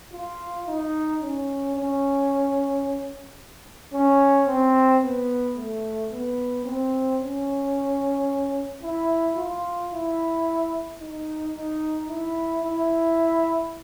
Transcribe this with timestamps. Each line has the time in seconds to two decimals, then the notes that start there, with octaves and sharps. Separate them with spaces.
0.13 F4
0.67 D#4
1.22 C#4
1.76 C#4
3.93 C#4
4.47 C4
5.03 B3
5.56 A3
6.11 B3
6.65 C4
7.19 C#4
8.82 E4
9.36 F4
9.92 E4
11.00 D#4
11.54 D#4
12.09 E4
12.64 E4